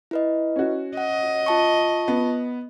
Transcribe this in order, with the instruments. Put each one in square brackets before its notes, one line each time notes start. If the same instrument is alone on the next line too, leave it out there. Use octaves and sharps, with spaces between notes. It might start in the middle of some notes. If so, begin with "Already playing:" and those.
[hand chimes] E4 B4 D#5
[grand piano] C#4 F#4
[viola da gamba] D#5 [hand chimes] F#5
[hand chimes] F4 A5 C#6
[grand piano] B3